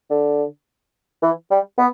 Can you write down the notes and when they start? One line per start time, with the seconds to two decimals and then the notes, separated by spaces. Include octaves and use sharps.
0.10 D3
1.23 E3
1.51 G3
1.78 B3